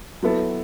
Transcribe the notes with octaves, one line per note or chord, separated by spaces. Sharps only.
F#3 B3 E4 A4